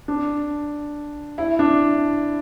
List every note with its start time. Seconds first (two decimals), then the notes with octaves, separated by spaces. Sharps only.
0.08 D4
1.38 E4
1.59 D4